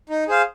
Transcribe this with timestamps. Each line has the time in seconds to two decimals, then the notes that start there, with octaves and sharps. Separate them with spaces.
0.10 D#4
0.28 G#4 C5 F5